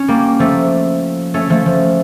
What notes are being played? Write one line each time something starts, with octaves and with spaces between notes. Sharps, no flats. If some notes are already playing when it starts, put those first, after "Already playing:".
Already playing: C#4
G3 A#3
F3 A3
A3 C#4
F3 A3
F3